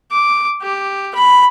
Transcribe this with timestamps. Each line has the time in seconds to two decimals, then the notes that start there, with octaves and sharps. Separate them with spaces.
0.11 D6
0.62 G4
1.15 B5